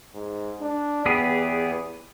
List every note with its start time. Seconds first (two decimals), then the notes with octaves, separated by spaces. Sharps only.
0.14 G#2
0.61 D4
1.06 E2 B3 G4 G#4